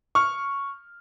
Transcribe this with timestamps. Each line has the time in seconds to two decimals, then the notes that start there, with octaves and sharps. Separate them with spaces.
0.15 C#6 F6